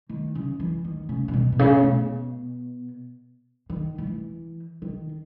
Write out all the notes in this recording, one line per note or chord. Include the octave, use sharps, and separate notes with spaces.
D#3
C#3
E3
D#3
C#3
C#3
B2
B2
C#3
B2
D#3
D#3
E3
D#3